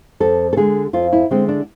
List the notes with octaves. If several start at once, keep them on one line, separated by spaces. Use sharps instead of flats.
F2 A4
A4
D3 G#3 G#4
F2 F4
E4
D3 G#3 C4
D4